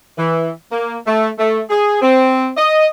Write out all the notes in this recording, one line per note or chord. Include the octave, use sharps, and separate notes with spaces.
E3
A#3
A3
A3
G#4
C4
D#5